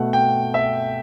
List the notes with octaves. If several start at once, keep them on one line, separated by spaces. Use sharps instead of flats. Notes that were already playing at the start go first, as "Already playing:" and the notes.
Already playing: B2 A3 F#5
G5
E5